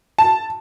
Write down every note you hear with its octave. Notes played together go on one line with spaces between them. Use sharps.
A5